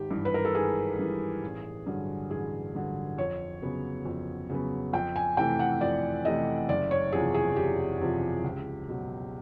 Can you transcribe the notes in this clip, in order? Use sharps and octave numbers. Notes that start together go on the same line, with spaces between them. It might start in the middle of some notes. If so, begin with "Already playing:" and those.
Already playing: G#1 G4
G2 E3
B4
A#4
A4
G#1 G#4
G2 E3
A1
G2 D3 F#3
A1 G#4
G2 D3 F#3
F2 C#5
C#3 F#3 B3
F2
C#3 F#3 B3
F2 G5
G#5
C3 E3 A3 G5
F#5
F2 D5
C3 E3 A3 D#5
F#1 D5
C#5
E2 C3 F3 G#4
G#4
F#1 G4
E2 C3 F3
C#2
B2 F#3